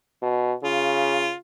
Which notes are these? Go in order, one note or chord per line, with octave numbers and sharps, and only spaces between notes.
B2
C#3 F4